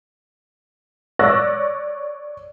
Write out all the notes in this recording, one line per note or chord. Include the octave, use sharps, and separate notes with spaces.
C#5 D5 C#6 E6 F#6 A#6